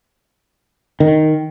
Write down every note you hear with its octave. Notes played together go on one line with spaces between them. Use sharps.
D#3